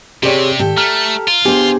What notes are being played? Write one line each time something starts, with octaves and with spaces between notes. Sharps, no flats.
C3 C4 G4 G#4 C#5 D5
G#2 D#3 G4 A4
A3 A#5 F6
F4
B3 D4 G4 G#4 C5